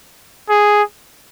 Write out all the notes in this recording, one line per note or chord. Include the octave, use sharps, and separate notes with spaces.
G#4